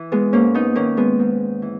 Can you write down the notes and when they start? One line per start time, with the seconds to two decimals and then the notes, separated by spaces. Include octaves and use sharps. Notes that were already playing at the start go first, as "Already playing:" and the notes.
Already playing: E3
0.12 G#3 B3
0.33 G#2 A#3 C#4
0.55 B3 D#4
0.76 D#3 A#3 C#4
0.97 G#3 B3
1.19 G#2
1.62 E3